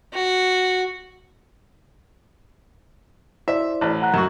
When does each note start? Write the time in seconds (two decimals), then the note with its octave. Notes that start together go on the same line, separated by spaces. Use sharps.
0.14 F#4
3.48 E4 C5 D5 E5
3.81 A1
4.02 F#5 A#5 F#6
4.14 F#2 F#4